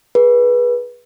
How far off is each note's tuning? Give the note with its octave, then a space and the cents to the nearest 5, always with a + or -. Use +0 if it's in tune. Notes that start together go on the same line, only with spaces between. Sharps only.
G#4 +0 B4 -25